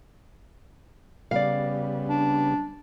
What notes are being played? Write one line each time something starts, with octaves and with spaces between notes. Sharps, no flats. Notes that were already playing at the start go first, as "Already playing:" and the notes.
C#3 G3 B3 D5 F5
D4